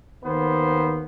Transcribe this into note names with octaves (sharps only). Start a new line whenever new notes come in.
D#2 D#3 B3 C5